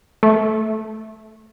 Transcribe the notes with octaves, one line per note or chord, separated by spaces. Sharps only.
A3